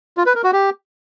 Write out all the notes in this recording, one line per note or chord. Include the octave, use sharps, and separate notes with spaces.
F4
B4
A#4
F#4
G4